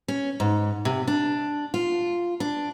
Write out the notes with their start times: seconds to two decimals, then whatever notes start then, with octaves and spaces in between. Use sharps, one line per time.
0.08 C#4
0.40 G#2
0.85 C3
1.07 D4
1.74 F4
2.40 D4